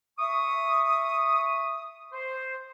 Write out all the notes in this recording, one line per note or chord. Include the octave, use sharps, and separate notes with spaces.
E5 C#6 D#6
C5